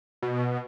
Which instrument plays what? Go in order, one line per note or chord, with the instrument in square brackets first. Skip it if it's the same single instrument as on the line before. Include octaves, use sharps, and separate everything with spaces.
[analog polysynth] B2